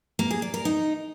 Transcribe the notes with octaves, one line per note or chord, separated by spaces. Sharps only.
A#3
G#4
D5
A#4
D#4